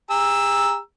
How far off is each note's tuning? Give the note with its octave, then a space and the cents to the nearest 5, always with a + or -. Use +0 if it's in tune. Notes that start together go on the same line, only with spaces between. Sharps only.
G4 +45 A#5 +0 E6 +0